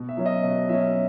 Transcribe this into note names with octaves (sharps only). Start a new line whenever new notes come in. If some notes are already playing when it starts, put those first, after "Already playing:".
Already playing: B2
E5
F#3 C#4
D#5
B2
F#3 C#4 E5